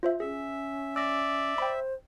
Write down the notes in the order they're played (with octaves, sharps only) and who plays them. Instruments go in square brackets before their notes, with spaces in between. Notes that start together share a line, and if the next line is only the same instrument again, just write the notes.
[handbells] F4 C5 E5
[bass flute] C#4 [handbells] G#4 [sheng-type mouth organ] E5
[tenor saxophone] D5 [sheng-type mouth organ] E5 [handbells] E6 A#6
[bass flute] C5 [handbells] G5 B5